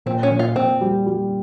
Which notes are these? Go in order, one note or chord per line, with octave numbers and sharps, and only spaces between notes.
A#2 C4
C#4
A#2
F4
A#2 C4
G3
G3